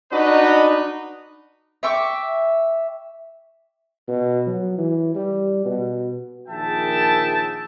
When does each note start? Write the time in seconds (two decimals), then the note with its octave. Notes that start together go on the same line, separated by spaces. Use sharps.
0.12 D4 D#4 F#4 B4 D#5
1.83 E5 G5 C#6 D6
4.08 B2
4.47 F#3
4.78 E3
5.15 G3
5.65 B2
6.49 A#1 D#3 G#4 E5 G5 A5